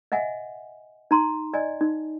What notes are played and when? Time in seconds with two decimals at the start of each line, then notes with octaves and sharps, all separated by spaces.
0.12 D#5 E5 F#5 G#5
1.11 D#4 A#5 C6
1.54 D5 D#5 G#5
1.81 D#4